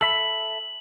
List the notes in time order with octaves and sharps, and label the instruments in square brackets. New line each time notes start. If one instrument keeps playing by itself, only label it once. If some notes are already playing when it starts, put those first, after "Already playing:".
[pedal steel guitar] A4 E5 B5 [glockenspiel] F#7